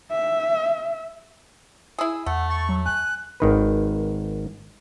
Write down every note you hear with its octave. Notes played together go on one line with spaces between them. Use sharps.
E5
E4 G#4 E6
E2 A3 F#5
C#6 A6
F#3
G#5 F#6
G#1 D#3 B4